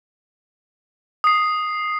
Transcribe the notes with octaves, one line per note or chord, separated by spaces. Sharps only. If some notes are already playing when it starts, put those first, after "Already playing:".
D#6 C7